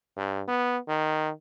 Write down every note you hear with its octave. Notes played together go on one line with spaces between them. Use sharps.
G2
B3
D#3